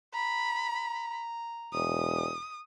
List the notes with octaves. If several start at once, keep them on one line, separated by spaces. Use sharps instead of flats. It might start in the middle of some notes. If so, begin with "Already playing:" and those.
A#5 B5
E1 D#6